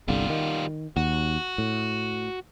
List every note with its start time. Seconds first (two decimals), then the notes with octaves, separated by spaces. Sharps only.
0.08 G1 C2 D3 G3 F4
0.30 D#3
0.97 D#2 F#4
1.58 A2